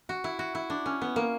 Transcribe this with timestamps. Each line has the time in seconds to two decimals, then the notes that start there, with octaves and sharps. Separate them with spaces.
0.09 F#4
0.24 E4
0.39 F#4
0.55 E4
0.70 D4
0.86 C#4
1.01 B3
1.16 A#3